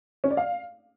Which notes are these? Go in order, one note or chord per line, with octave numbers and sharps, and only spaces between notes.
C#4
D5
F5